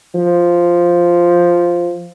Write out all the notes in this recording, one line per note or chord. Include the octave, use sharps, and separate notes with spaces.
F3